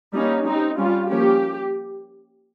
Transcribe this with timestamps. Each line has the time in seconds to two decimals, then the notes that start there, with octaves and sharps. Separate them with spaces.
0.13 G3 A#3 C#4 D#4
0.46 G3 C4 D#4
0.78 G3 C#4 F4
1.10 F3 A#3 C#4 G4